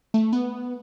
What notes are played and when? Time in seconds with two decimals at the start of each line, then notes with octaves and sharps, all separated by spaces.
0.14 A3
0.33 B3